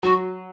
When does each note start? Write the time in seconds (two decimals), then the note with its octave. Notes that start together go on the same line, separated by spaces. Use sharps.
0.03 F#3 F#4